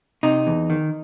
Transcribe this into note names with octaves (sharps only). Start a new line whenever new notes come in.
C3 D#4
E2
D#3